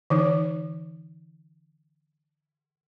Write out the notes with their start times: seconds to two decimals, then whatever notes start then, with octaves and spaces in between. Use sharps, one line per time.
0.10 D3 E3 D#4